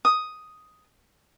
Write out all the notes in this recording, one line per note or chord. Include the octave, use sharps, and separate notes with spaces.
D#6